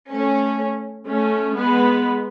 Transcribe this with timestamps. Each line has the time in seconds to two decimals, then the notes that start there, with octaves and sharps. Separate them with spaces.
0.11 A3 C#4
1.07 A3 C#4
1.56 G#3 B3